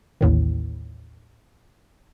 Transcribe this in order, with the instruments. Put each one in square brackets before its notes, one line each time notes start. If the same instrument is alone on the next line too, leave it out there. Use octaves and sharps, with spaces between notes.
[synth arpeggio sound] A1 D#2 A2 D#3